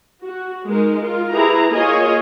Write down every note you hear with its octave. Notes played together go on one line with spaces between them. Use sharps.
F#4
G#3 D#4 A#4
F4 A#4
E4 G4 G#4 B4 A#5
A#3 F4 G#4 C#5 D#5 G#5